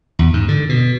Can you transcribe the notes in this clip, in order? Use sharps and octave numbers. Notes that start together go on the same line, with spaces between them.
E2
G#2
D3
B2